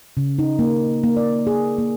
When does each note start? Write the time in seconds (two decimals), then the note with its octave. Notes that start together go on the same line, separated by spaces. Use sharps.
0.17 C#3
0.39 D#4
0.59 A#3
1.03 A#3
1.17 D5
1.47 G#4
1.78 A#3